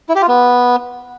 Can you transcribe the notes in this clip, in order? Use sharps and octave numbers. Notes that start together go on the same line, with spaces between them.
E4
G4
F4
B3